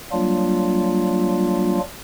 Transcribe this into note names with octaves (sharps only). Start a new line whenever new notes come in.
F#3 G3 A#3 D4 F4